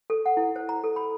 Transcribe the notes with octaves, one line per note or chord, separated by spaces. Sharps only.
A4
F#5
E4
C5
A#5
A4
B5